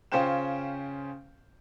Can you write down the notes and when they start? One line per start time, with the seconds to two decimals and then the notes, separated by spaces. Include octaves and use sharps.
0.12 C#3 C#4 F4 C5 G5 E7